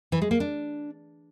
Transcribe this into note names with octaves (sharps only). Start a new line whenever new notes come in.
E3
G#3
A#3
D4